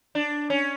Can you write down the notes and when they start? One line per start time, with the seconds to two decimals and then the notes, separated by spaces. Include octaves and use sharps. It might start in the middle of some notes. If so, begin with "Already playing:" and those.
0.15 D4
0.50 C#4